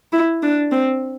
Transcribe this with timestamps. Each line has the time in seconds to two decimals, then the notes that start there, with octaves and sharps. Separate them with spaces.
0.12 E4
0.43 D4
0.71 C4